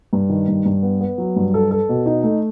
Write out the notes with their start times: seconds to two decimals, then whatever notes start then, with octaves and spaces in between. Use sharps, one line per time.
0.13 G2
0.29 D#3
0.48 G2
0.65 G2
0.83 B3
1.01 B3
1.18 F#3
1.36 G2
1.54 A4
1.71 A4
1.89 B2
2.06 D#4
2.24 A3